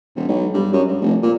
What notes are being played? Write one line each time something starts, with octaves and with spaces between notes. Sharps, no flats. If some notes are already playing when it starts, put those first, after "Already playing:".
E1
B1
G2
F#2
G2
F1
A#2